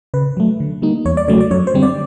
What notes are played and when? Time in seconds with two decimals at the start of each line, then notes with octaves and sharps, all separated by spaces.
0.14 C#3 B4
0.37 F#3 A3
0.60 D3
0.82 G3 A#3 D#4
1.05 E2 C#5
1.17 D5
1.28 C#3 F#3 A3 D5
1.41 D5
1.51 F#2 C#5
1.67 C5
1.74 D3 G3 C4
1.83 D5